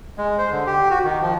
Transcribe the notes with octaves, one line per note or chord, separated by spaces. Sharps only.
G#3
C5
D3
G4
F#4
D#3
F3